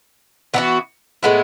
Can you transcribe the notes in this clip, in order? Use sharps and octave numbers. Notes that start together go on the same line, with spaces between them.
E3 B3 D#4 F#4
A2 G#3 B3 E4